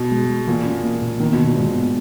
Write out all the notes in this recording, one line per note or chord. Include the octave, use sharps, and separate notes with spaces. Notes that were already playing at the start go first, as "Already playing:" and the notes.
Already playing: B2
G#3
G#3
A#2 E3
C#4
A#3
A#2
D#3 B3
B2
D#3
A#2
G#2 E3
B3